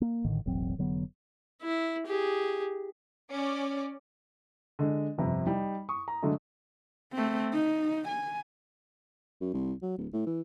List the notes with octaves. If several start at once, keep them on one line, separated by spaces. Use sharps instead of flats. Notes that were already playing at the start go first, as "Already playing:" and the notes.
A#3
A1 A2 D3 D#3
E1 A1 F#3 C4
F1 D3 F#3 B3
E4
G4 G#4
C#4 D5
D3 G#3
G1 F2 C3
G3 D#4
C#6 D#6
A#5
D3 F#3 G#3 A3
A3 C4
D#4
G#5
F#2
C2
F#3
D1
A2
E3